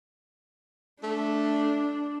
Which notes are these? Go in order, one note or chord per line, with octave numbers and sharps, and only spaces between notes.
A3 D4